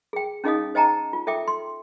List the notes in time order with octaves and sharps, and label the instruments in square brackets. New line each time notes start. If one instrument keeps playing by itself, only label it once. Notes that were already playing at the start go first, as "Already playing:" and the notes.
[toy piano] G#4 G5
C#4 D#4 G#4 D#5 F5 D#6
C5 D#5 G5 A5 A#5
F4
A4 E5 G5 D6
C6